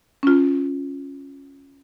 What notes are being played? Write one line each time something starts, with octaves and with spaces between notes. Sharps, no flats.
C#4 F4